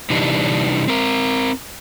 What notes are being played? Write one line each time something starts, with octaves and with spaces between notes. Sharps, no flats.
C3 E3 G3 D4 D#4
C4 A#4